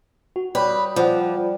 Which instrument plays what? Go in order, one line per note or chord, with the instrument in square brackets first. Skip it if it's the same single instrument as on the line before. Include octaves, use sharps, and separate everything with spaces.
[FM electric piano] F#4
[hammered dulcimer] G3 [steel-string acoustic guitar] B4 [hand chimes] C#5 B5
[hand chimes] D#6
[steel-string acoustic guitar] F3 [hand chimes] F4 [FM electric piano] D5 F#5